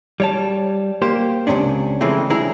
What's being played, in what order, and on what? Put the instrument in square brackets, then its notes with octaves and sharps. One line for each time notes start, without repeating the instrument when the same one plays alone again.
[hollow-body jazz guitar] G3 C#5 A5
A#3 G4 C5
C#2 G#2 C3 C#4 D4
C#3 E3 F3 G#3 A3 C4
C2 E3 D4 E4 G#4 A#5